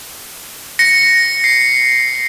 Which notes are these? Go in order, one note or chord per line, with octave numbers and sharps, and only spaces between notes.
A#6 C#7
C7